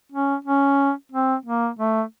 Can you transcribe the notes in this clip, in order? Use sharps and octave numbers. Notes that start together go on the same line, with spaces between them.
C#4
C#4
C4
A#3
A3